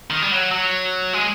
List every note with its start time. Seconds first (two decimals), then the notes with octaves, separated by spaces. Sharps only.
0.10 D#3
0.22 G3
0.32 F#3
0.51 F#3
1.13 G#3